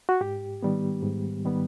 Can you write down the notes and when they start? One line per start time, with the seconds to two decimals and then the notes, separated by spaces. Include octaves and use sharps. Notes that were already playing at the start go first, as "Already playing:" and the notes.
0.09 F#4
0.21 G#2 G4
0.63 D#3 G3 B3
1.03 G#2
1.45 D#3 G3 B3